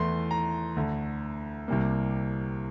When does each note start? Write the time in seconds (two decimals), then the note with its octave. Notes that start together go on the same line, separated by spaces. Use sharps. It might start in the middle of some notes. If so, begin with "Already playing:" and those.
Already playing: E2 E3 A3 C6
0.31 A#5
0.76 D2 D3 A3
1.68 C2 C3 G3 A#3